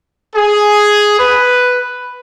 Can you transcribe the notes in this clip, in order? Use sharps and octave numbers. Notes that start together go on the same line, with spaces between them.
G#4
B4